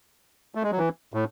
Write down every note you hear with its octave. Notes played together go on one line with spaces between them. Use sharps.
A3
G#3
F#3
E3
A2